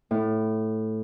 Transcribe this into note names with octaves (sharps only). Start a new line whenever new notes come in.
A2